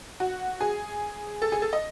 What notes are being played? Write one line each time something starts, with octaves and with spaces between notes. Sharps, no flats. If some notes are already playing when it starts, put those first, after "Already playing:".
F#4
G#4
A4
G#4
A4
D#5